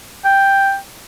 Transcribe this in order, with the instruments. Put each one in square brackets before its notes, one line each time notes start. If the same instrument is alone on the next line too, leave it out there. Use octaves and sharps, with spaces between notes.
[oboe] G5